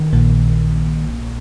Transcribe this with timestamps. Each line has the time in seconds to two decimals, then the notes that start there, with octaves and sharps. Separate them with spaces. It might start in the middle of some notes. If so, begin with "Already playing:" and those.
Already playing: D#3
0.13 A#1 A#2 A#3